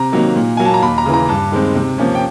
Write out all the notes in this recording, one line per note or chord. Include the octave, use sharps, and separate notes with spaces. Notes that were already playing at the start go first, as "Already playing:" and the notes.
Already playing: C3 A#5
D#3 F#3 A#3
A#2
F#3 A#3 G#5
A5
A#5
D#2 B5
A#5
C#3 E3
A#5
G2 A5
D#3 G#3 C4
C3
F3 A#3 C#4
G5